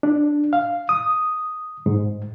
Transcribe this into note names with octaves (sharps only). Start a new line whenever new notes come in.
D4
F5
D#6
G#2